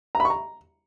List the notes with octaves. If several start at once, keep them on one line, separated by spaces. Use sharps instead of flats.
A#5
B5
C#6
A#5